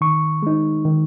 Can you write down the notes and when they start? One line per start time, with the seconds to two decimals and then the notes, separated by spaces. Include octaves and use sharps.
0.01 D#3 C#6
0.42 G#3 D#4
0.85 D#3